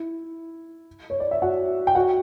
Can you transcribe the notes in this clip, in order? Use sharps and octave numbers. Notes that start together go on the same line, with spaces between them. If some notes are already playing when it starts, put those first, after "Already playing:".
Already playing: E4
C#5
D5
E5
F#4 F#5
G5
F#4 F#5